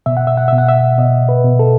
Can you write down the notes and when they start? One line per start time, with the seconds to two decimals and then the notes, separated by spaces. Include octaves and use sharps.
0.06 B2 E5
0.17 F#5
0.27 E5
0.37 F#5
0.48 B2 E5
0.58 F#5
0.69 E5
0.98 B2 D#5
1.29 B4
1.44 B2
1.59 A4